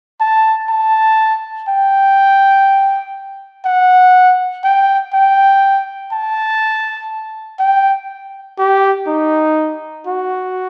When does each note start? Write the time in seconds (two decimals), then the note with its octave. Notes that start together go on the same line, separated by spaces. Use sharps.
0.21 A5
0.70 A5
1.68 G5
3.66 F#5
4.64 G5
5.14 G5
6.12 A5
7.60 G5
8.59 G4
9.07 D#4
10.07 F#4